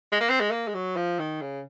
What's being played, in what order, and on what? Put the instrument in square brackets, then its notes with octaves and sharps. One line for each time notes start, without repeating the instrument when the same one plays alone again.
[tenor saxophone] G#3
A#3
C4
G#3
A#3
G#3
F#3
F3
D#3
C#3